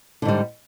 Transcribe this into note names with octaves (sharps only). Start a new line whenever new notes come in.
G#2 D3 G3